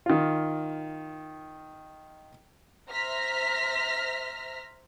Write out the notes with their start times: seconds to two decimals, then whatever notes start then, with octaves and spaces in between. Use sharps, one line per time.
0.06 D#3 F4
2.91 C5 E5 A#5 F6 A#6 B6